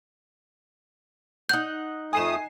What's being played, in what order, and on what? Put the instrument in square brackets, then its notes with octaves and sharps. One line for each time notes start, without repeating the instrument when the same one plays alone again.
[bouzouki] D#4 F#5 [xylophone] G6
[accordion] F2 A3 D#6 [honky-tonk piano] G#5 C7 E7